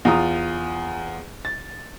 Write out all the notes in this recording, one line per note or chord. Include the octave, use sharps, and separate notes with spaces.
E2 F4 A#5 D#6
A6